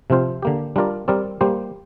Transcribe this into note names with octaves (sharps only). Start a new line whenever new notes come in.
C3 F3 C4 F4 C5
D3 A#3 G4
G3 D4 F4 A#4 D5
G3 C4 A#4 D5
G3 A#3 G4 C5